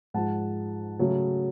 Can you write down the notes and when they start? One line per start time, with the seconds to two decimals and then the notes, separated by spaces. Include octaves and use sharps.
0.14 G#2 F3 G#3 F#5 A5
0.99 C#3 F#3 A3